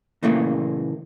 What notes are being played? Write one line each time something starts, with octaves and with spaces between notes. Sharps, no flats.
A#2 C#3 E3 A3 A#3